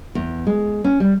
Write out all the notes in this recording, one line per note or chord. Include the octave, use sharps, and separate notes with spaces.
E2
G#3
C#4
G3